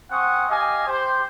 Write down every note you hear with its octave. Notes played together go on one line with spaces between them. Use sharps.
C4 F#5 G#5 C#6 D#6
G4 D#5 F5 G#5
G4 C5